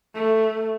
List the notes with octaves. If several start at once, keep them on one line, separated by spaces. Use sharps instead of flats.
A3